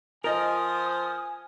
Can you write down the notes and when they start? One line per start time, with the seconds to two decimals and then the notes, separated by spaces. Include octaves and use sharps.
0.24 F3 F4 A#4 D#5 G#5 D#6